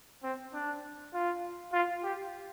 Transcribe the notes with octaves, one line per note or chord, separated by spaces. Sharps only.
C4
D4
F4
F4
G4